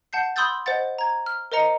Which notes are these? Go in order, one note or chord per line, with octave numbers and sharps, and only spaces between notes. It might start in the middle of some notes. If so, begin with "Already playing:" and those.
F#5 A5 G6 C7
B5 C6 D#6 E6 G6 A6
C5 D#5 F#5 A6
A#5 G#6
F6
A#4 C5 D#5 A#5 C#7